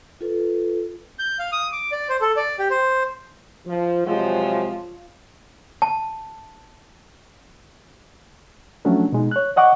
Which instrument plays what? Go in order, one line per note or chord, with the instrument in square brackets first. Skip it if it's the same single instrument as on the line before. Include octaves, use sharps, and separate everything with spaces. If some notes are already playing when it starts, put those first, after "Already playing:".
[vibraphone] F4 A4 B4
[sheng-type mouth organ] G6
F5
D#6
D6
D5
C5
A4
D5
G4
C5
[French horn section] F3
[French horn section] C3 F#3 G#3 [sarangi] F3
[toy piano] A5
[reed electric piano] F3 F#3 A3 C#4 D4
B2 G#3 D#4
C#5 F#6
D5 D#5 F#5 C#6 D6